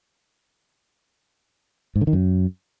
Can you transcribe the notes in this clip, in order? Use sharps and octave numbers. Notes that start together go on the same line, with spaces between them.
G#2
D3
D#3
F#2